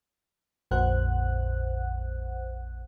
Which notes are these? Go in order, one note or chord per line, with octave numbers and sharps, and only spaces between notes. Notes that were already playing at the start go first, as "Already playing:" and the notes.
A#1 F2 A#2 C5 F#5 F#6